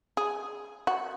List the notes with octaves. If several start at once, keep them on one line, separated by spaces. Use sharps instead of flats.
G#4
F#4